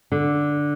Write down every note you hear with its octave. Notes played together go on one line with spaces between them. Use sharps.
D3